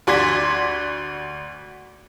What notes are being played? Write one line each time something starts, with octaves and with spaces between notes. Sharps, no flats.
D2 F#4 D5 C6 G#6 B6